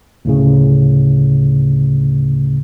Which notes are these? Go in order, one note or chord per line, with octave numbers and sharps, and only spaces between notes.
D2 A2 C#3